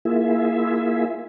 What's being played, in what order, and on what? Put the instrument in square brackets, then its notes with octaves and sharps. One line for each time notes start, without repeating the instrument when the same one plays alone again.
[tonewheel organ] A#3 E4 F4 G#4 E5